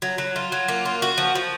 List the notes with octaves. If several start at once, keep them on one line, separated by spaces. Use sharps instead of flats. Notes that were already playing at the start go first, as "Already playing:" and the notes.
F#3
F#3
F4
F#3
A#3
F4
F#4
F3
F3